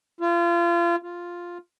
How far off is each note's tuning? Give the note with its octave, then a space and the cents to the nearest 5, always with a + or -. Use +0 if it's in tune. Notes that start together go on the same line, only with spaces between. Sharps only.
F4 -30
F4 +0